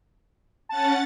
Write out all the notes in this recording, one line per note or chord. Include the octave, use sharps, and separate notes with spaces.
C#4 F#5 A5 A6